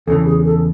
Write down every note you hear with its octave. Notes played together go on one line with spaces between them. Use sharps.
E2 C#3 E3 A4
G#4
A4